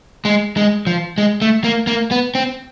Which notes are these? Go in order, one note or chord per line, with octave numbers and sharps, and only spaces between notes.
G#3
G#3
F3
G#3
A3
A#3
A#3
B3
C4